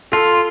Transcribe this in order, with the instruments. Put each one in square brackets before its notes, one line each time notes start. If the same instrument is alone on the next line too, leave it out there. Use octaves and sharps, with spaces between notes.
[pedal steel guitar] F4 [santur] A4